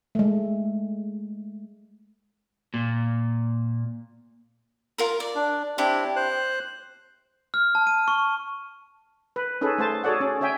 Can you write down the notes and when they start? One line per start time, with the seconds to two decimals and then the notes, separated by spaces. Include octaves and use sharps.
0.15 G#3 A3
2.74 A#2
4.98 F4 A#4 A#5
5.20 D5
5.36 D4
5.78 C4 D4 E4 G4 C#5
6.16 C5 F#6
7.54 F6
7.75 A5
7.87 D#7
8.08 C#6
9.36 B4
9.61 C#4 D#4 G#4 A4 B4
9.78 A3 C5 A5
10.04 F#4 G#4 A4 C#5 D5 F#5
10.21 C#4
10.41 C#4 C#5 E5 G5 G#5